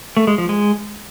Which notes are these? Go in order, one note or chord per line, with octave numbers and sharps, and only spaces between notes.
A3
G#3
F3
G#3